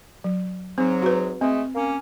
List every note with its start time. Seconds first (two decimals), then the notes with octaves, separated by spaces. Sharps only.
0.24 F#3
0.78 G#2 F#3 C4
1.03 F#4 B4
1.41 G#3 A3 C4
1.75 A#3 C#4